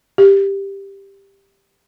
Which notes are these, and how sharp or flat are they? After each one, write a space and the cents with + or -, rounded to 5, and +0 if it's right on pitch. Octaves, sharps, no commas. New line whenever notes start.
G4 +10